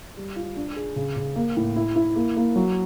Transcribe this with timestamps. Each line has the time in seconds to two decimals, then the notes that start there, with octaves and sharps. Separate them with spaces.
0.17 G3
0.36 F4
0.57 D4
0.76 G#4
0.96 C#3
1.16 C#3
1.36 A#3
1.57 A2
1.76 E4
1.96 E4
2.16 A#3
2.36 A#3
2.56 F#3